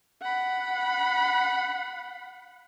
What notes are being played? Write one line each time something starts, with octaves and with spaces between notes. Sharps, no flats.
F#5 B5